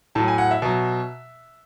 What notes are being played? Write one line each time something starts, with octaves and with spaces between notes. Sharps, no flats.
A2 F#3 A5
G#5
F#5
E5
B2 F#3